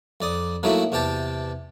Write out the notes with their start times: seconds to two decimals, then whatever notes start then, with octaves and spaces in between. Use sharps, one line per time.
0.21 F2 D5 D#6
0.63 F#3 A3 A#3 D#4 E4 F#4
0.92 E2 C3 G4 G5 A5